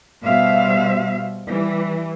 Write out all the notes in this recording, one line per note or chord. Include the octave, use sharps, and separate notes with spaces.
B2 G3 C5 E5 F5
E3 G3